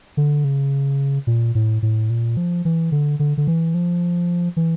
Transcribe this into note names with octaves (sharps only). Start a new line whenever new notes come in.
D3
C#3
A#2
A2
A2
A#2
F3
E3
D3
D3
D3
E3
F3
E3